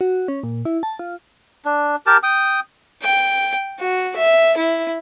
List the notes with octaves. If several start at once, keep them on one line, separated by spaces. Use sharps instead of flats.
F#4
C#4
A#2
E4
A5
F4
D4
G4 A#4 A5
G5 D#6
G5
F#4
E5
E4